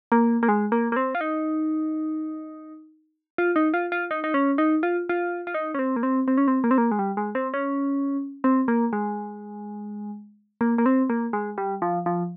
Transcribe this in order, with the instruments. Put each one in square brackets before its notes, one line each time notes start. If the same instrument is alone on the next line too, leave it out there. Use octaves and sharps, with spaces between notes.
[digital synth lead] A#3
A#3
G#3
A#3
A#3
C4
F4
D#4
F4
D#4
F4
F4
D#4
D#4
C#4
D#4
F4
F4
F4
D#4
C#4
C4
A#3
C4
C4
C#4
C4
A#3
C4
A#3
G#3
G3
G#3
C4
C#4
C4
A#3
G#3
A#3
A#3
C4
A#3
G#3
G3
F3
F3